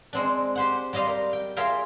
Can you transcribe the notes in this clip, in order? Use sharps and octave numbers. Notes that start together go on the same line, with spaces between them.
G#3 C4 D4
G4 C5 F#5
G3 G4 D#5 F5 C6
A#4
G5
F4 G#4 A#4 E5 F5 G5